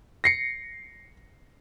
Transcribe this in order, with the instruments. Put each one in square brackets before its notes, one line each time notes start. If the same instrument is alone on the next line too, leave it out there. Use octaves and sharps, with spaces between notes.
[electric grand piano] A#6 C7 C#7